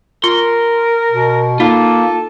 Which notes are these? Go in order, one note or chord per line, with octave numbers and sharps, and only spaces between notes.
F4 A#4 C6
B2
A#3 D#4 F4 A4